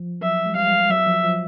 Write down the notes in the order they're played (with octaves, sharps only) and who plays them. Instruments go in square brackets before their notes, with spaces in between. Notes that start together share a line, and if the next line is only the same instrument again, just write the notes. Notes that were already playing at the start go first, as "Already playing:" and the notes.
Already playing: [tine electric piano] F3
[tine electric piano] F#3 [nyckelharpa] E5
[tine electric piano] G#3
[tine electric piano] G3 [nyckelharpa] F5
[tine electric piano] F#3 [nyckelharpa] E5
[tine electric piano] F3
F3